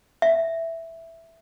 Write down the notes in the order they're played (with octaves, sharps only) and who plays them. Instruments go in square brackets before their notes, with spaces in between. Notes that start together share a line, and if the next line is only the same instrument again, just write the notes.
[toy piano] E5